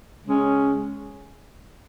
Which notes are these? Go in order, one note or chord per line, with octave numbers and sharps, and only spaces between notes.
C#3 G#3 C#4